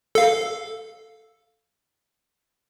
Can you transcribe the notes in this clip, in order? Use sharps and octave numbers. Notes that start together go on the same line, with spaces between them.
A4 F5